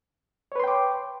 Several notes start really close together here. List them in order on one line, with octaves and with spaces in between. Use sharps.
C#5 B4 C6 G5 D6